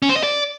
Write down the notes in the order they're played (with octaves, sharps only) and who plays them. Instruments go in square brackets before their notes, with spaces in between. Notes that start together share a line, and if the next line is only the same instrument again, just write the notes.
[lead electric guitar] C#4
C5
D#5
D5